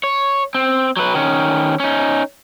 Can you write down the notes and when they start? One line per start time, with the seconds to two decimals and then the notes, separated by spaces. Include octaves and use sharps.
0.03 C#5
0.55 C4
0.97 F#3 B4
1.15 D#3 C#4
1.80 C#4 D#4